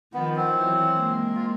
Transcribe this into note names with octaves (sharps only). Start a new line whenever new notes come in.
D#3 F3 B3
C4
E3 F#3
G#3 A#3
F4